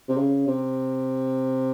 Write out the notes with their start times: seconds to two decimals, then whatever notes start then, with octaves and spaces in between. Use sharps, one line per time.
0.08 C3
0.17 C#3
0.47 C3